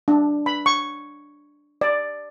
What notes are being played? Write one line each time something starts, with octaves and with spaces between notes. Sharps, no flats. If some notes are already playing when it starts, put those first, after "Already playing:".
D4
B5
C#6
D5